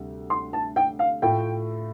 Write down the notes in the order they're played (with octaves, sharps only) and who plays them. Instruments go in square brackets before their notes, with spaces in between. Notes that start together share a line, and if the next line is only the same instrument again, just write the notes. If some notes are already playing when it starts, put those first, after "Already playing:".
Already playing: [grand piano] D2 C3 G3
[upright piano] C6
A5
G5
F5
[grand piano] A2 A3 F4 [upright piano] G5